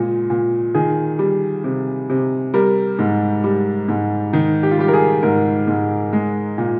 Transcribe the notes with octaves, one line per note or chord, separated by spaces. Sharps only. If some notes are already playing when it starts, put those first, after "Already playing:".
Already playing: A#2 G#3
A#2
D#3 G#4
G3
C3
C3
G3 A#4
G#2
G3
G#2
D#3 D#4
G4
F4
G3 G4
A#4
G#4
G#2 A#4
G#2
G#3
A#2